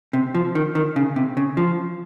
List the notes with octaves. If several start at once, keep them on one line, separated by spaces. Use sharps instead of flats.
C3
F3
D#3
D#3
C#3
C3
C#3
F3